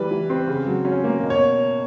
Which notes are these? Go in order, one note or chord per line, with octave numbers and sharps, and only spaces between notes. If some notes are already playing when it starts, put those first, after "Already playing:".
Already playing: E3 G3 B4
E3
C4
C#3
F#3
C#4
A#3
B2
C#5